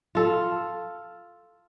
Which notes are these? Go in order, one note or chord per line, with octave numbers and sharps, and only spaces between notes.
F4 A4